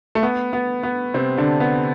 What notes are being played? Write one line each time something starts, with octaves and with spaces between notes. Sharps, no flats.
A3
B3
B3
B3
C3 C4
D3 D4
B3